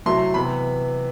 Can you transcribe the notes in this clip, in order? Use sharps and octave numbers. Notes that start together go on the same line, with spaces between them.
C3 F#3 A3 E4 C6
C3 E3 B3 B5